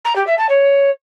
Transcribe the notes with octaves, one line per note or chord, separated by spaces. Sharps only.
A#5
G4
E5
A5
C#5